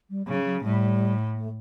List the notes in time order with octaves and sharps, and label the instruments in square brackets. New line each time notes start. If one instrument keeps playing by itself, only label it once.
[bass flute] G3
[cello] C#3 [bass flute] F#3
[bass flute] F#3
[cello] A2 [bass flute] G3
[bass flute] A3